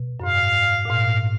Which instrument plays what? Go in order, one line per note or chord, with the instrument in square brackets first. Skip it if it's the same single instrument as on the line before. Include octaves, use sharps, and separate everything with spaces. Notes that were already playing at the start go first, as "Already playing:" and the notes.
Already playing: [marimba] B2
F#2
[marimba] G#2 [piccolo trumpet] F5
[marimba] A#2
[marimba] G#2 [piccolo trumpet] F5